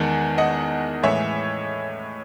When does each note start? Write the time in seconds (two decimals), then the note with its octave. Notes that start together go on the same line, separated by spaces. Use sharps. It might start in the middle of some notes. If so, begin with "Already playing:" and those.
Already playing: E2 D#3 G#3 F#5 A5
0.38 D#5 F#5
1.03 A2 E3 G#3 C#5 E5